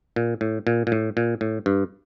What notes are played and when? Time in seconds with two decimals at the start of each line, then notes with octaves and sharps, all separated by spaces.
0.16 A#2
0.41 A2
0.67 A#2
0.87 A#2
0.92 A2
1.17 A#2
1.41 A2
1.66 G2